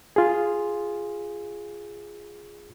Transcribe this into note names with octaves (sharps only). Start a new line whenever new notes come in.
F4 G#4